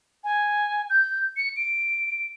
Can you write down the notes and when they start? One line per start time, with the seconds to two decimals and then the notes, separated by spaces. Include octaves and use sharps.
0.24 G#5
0.90 G6
1.37 C#7
1.57 D7